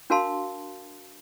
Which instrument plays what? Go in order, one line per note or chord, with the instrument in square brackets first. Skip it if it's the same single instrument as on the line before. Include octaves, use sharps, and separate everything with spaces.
[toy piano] D4 F#4 A#4 F5 A5 C6